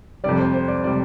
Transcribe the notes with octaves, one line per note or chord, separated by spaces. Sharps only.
F2 C3 G3 D5
C5
C5
D5
C3 G3 D5